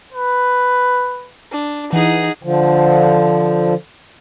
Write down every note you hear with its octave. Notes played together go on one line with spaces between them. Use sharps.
B4
D4
E3 D#4 G#4 F#5
D3 F3